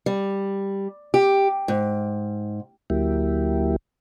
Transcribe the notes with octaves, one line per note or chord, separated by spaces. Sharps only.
G3
G4
G#2
D2 F#3 A#3 E4 G4